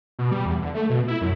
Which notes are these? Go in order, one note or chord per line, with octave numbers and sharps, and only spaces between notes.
B2
G3
E2
D3
A3
B2
E4
F#2